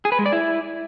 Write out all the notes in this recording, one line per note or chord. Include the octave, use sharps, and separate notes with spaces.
G#4
B4
G#3
D5
E4